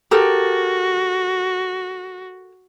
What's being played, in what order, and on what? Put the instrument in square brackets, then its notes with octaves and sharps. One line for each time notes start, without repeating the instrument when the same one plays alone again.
[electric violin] F#4 [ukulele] G4 A4 A#4